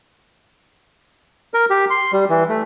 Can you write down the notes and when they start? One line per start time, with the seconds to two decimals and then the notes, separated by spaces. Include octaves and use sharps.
1.54 A#4
1.70 G4
1.90 C6
2.13 G3
2.30 E3
2.49 A3